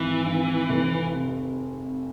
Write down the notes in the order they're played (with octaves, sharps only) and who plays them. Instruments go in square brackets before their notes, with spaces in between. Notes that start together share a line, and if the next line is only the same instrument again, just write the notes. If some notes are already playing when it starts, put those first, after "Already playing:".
Already playing: [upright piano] G#1 [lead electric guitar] E3
[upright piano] G#1
F1
C3